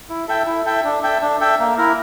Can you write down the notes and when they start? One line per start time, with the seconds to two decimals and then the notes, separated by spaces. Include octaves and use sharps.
0.10 E4
0.28 A4 E5 G5
0.46 E4
0.65 A4 E5 G5
0.84 D4
1.03 A4 E5 G5
1.22 D4
1.40 A4 E5 G5
1.59 A#3
1.78 E4 A#4